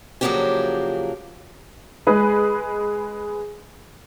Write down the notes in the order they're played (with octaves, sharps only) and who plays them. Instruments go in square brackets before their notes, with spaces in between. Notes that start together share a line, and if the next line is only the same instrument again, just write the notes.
[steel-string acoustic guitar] C#3 F3 F#3 A#3 D4 G4
[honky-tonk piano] G#3 G#4 B4